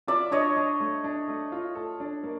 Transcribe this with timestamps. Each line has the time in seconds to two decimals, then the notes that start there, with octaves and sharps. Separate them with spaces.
0.07 F4 D5 E5
0.31 D4 C#5 D#5
0.57 D4
0.80 A3
1.04 D4
1.28 A3
1.52 F4
1.75 A4
2.00 D4
2.23 A#3